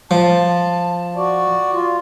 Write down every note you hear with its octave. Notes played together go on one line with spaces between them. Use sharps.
F3 A5
F#4 D5
F4